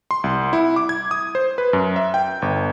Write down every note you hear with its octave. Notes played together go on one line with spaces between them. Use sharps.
C6
C2
E4
D6
G#6
D#6
C5
B4
F#2
E5
G5
G1